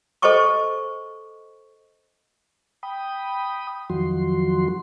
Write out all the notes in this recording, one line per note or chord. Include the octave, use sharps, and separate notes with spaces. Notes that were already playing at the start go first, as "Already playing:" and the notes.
A4 C5 D#5 G5 C#6 D6
G5 B5 D#6
F2 D#3 F3 F#3 F#4 C6